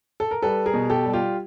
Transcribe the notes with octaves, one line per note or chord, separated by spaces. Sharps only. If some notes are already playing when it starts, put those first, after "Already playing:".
A4
A#4
G3 A4 B4
G#4 A#4
B2
G4 A4
G3
F4 G4